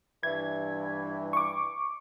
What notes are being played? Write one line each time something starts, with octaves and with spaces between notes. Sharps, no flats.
G2 E3 G#6
C#6 D6